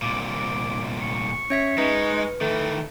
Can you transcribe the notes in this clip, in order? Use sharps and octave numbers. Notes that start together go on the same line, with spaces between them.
C2 A#2 D6
D6
C#6
C#4 C#5 E5 B6
G#3 D#4 B4
D#3 E3 A3